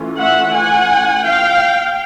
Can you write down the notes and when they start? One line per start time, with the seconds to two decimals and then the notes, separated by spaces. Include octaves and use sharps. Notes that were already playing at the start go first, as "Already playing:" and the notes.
Already playing: E3 A3 C#4 F4
0.18 E5 F#5
0.53 F#5 G#5
1.25 F5 G5